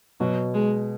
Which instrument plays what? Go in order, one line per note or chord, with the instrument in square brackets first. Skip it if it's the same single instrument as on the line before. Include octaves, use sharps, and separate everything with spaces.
[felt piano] B2 [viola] F#3
[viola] G#3